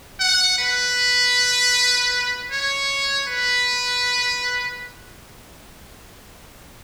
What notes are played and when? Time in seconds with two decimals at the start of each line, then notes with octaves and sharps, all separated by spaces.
0.20 F#5
0.58 B4
2.51 C#5
3.28 B4